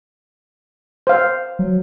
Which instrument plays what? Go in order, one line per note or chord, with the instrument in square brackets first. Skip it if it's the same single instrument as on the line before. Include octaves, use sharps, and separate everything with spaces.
[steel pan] C5 F5
[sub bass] F#3